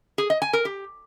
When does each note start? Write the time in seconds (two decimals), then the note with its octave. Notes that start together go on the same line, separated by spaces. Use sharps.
0.18 G#4
0.30 D#5
0.42 G#5
0.53 A#4
0.65 G4